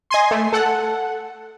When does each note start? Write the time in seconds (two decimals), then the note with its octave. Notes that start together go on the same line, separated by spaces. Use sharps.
0.10 D#5 G#5 C6
0.31 A3
0.53 A4 F#5